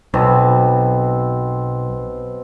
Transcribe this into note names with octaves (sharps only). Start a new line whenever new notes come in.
B1 B2 C4